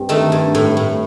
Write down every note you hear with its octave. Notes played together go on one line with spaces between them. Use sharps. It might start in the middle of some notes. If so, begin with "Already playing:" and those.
Already playing: G2 C4
D#3 A3
G2
A2
A2